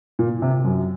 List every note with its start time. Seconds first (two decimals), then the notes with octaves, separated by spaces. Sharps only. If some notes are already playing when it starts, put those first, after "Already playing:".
0.19 A#2
0.42 C3
0.65 F#2